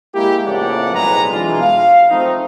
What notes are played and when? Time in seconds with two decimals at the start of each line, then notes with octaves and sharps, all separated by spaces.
0.15 G#3 A#3 E4 G4
0.46 F2 A2 C#3 A#3 D5 F#5
0.93 B1 F2 A2 G#3 B4 A#5
1.31 B2 E3 G#3 D4 F4
1.61 F5
2.10 F3 A3 C4 D#4